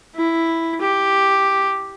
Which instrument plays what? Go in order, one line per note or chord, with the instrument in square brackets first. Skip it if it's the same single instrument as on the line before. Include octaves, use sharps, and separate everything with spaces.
[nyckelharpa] E4
G4